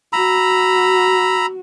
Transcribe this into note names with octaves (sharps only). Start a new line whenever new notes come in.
F#4 A#5 B5 E6